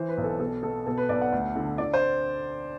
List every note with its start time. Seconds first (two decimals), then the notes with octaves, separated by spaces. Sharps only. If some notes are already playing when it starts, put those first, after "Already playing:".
Already playing: E3 C5
0.09 B4
0.17 B1
0.24 A4
0.40 B2 A4
0.63 B2 A4
0.87 B2 A4
0.97 B4
1.09 B1 D5
1.21 F#5
1.32 D2
1.55 D3
1.78 D3 D5
1.94 C5